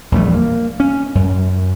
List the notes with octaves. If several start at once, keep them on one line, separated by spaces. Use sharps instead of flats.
A#1 E2 G3 A3
A#3
C#4
F#2